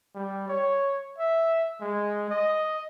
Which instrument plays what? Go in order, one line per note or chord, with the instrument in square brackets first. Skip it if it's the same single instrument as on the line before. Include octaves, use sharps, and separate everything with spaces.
[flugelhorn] G3
C#5
E5
G#3
D#5